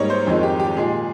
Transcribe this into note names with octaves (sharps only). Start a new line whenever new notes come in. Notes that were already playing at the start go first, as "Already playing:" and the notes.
Already playing: G#2 G3 A#3 C#5 D#5
C5
F2 D#3 G#3
G4
G4
A#2 G#3 G#4